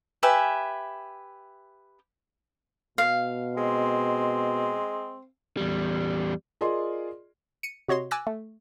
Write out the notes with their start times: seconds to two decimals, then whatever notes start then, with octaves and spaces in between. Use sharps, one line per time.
0.23 G4 B4 E5 G#5
2.98 B2 F5
3.57 G#3 C4
5.57 E2 G3
6.61 F4 G#4 A#4 D5 D#5 C6
7.63 C#7 D#7
7.88 C3 F#4 C#5 D#5 C6
8.11 G#5 D6 E6 F#6 A6 A#6
8.27 A3